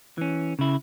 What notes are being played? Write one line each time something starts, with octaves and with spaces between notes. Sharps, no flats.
E3 C#4
C#3 E4